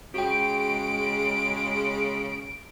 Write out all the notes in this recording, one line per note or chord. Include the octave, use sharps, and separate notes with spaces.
C#3 G#3 F#4 G5 D7